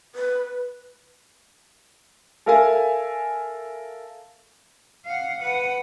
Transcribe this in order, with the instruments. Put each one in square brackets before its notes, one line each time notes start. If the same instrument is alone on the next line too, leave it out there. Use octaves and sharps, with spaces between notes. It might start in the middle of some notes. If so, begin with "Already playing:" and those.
[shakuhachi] B4
[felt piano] A4 A#4 E5 F5 G#5
[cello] F5 F#5
B4 F#5